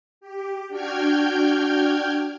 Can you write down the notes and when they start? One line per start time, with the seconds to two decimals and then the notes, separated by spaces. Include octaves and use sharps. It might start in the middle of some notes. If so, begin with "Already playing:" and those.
0.21 G4
0.69 D4 F#4 G5 F6 G6 G#6